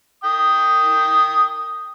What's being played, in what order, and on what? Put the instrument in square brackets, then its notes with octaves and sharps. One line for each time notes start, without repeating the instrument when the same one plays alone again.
[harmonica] G5 D#6